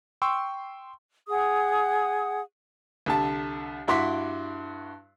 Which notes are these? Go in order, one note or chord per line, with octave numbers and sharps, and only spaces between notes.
G5 C6 C#6 E6
G#4 F#5 D#6
C2 D3 A5
G2 E4 F#4 C6 D6 B6